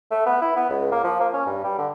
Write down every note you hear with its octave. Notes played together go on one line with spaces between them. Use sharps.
A3
B3
E4
B3
C#2
A#3
F3
A#3
C#4
G2
G3
D3